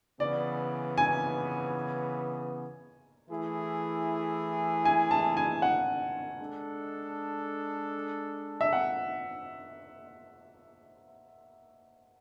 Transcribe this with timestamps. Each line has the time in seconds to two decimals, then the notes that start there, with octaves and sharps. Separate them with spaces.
0.20 C#3 E3 B3 D5
0.98 G#5
3.30 E3 A3 E4 G#4
4.85 G#5
5.11 A5
5.37 G#5
5.62 F#5
6.40 G#3 D4 A4
8.61 E5
8.73 F#5